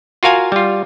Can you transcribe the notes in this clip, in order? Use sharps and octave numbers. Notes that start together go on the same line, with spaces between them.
F4 F#4 A#4 F5 G#5
G3 F4